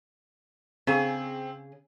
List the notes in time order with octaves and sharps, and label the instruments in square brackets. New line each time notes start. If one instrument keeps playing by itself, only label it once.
[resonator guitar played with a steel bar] C#3 G#4 [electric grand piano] C4